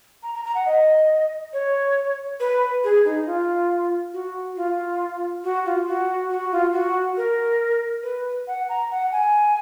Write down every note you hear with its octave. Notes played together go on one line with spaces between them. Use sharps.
A#5
A#5
A#5
F#5
D#5
C#5
B4
G#4
D#4
F4
F#4
F4
F#4
F4
F#4
F#4
F4
F#4
A#4
B4
F#5
A#5
F#5
G#5